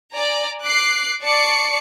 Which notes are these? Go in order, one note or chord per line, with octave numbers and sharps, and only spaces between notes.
D5 G#5 A#5
D6 F#6 C7
D5 A5 C#6 D6 C7 C#7